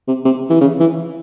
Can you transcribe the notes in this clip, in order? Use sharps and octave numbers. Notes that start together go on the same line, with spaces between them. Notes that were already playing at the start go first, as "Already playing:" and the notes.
C3
C3
E3
C#3
E3